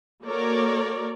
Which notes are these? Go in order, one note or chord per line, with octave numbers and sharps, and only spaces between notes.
A#3 F#4 A4 A#4 C#5 D5